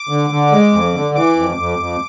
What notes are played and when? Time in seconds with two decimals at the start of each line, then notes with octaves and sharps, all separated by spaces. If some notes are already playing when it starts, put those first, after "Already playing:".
Already playing: D6
0.09 D3
0.30 D3
0.52 G#3
0.73 F2
0.93 D3
1.15 E3 D6
1.36 F2
1.57 F2
1.79 F2